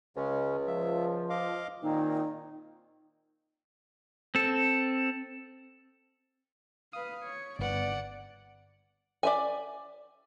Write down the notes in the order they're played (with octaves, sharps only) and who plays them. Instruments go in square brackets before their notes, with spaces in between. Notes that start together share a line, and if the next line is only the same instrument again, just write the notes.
[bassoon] C#2 [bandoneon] C#3 G#3 C#4
[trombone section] F3 [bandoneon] E5
[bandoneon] D#5 F5 D6
[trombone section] A#2 D#3 [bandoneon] C4 [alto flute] D#4
[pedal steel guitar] C4 A4
[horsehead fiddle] B4 F5 [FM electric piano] D#6
[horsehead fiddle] C#5
[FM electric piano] G1 B3 [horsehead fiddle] D5 F#5
[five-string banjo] D5 E5 G#5